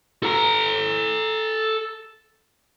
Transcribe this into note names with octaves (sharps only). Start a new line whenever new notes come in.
A4 A#5